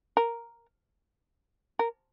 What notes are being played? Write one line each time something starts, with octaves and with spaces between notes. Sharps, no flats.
A#4
A#4